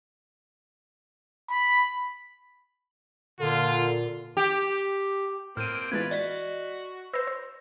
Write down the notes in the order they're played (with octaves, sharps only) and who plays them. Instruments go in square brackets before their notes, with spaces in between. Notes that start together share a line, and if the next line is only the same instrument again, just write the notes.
[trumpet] B5
[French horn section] A#2 [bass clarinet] D3 [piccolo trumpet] F4 [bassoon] A4
[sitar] G4
[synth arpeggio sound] A2 [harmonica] A#3 C4 [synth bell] F6 G6 D#7
[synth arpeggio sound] E3 G#3 B3 [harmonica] F4 B4 [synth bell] G#6 A6
[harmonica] F#4 [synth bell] D5 D#5 B6
[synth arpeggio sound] B4 C5 [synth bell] E6 A#6
[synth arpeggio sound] C5